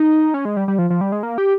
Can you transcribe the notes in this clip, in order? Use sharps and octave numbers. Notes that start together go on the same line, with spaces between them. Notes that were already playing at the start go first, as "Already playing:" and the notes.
Already playing: D#4
C#4
G#3
G3
G3
F3
F3
G3
G#3
A#3
G4